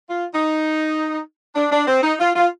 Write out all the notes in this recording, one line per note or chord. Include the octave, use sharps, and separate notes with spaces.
F4
D#4
D4
D4
C4
D#4
F4
F4